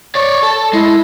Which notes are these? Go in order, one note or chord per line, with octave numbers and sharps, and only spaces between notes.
C#5 D5 C#6
A4 A5
G#3 E4